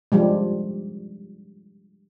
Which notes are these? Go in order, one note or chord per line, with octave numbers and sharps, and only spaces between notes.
F3 G3 G#3